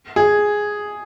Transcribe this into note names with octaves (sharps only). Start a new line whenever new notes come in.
G#4